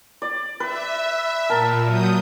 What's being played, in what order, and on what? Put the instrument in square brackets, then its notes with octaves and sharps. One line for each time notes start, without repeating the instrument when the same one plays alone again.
[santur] D5
[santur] B4 [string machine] E5
[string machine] A#2 [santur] A#4 A5
[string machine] F#3 D#6 G6